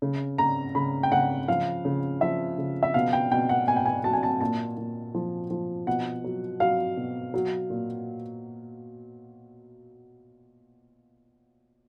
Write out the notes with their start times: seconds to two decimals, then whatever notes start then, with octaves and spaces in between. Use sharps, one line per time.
0.02 C#3
0.38 C#3 A#5
0.75 C#3 B5
1.03 G5
1.12 C#3 F#5
1.48 F3 F5
1.85 C#3
2.21 F3 E5
2.58 C#3
2.83 E5
2.94 B2 F5
3.13 G5
3.31 B2 G5
3.49 F#5
3.68 B2 G#5
3.76 G5
3.85 G#5
4.04 F#3 A5
4.13 G#5
4.23 A5
4.41 A#2 A5
4.77 A#2
5.15 F3
5.51 F3
5.87 B2 F#5
6.24 F#3
6.60 F#3 F5
6.97 B2
7.34 F#3
7.70 A#2